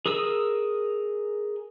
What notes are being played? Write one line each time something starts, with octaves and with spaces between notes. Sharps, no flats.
G#4 A#4 D#6 E6